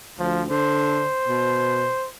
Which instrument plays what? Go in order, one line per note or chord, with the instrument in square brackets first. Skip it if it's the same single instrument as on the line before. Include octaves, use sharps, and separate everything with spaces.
[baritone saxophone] D2 [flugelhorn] F3
[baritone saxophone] D3 [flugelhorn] C5
[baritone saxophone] B2